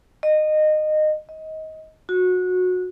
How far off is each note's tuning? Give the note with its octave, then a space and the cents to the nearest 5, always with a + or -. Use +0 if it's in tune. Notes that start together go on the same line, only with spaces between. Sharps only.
D#5 -20
D#5 +20
F#4 -20